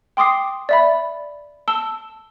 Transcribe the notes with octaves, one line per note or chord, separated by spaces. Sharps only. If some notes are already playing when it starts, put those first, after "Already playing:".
G5 C6 D6 D#6 C7
D5 E5 B5
A5 E6 G7